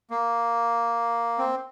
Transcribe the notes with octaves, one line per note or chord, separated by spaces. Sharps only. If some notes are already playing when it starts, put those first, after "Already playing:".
A#3
C4